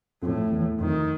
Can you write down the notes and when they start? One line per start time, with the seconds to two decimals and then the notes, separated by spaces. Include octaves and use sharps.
0.22 F2 A2
0.52 E2
0.81 F2 D#3